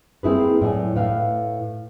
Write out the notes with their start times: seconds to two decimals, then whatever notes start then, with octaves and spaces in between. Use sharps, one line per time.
0.23 A#3 C4 E4 G#4 B4
0.61 A2 F#3 D5 G#5
0.96 A2 B4 F5